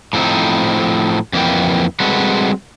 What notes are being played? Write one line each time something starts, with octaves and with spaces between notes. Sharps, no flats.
A2 F3 F#3 C4 D#4
F2 E3 A#3 B3 G5
G3 G#3 C4 F#4 A4 B4